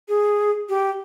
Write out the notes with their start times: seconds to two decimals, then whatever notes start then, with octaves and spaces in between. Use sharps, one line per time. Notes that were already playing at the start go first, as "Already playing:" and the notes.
0.09 G#4
0.69 G4